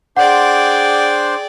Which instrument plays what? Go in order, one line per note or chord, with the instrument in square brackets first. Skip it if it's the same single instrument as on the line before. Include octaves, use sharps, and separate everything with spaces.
[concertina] D4 C5 C6 [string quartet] G#4 D5 G5 [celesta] F#5